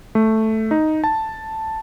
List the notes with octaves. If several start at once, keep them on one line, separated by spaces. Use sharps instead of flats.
A3
D#4
A5